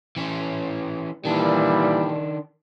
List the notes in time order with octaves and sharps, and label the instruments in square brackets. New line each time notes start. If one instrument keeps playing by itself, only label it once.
[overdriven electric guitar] E3 C#4
[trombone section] A#2 E3 G3 [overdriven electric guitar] D#3 D4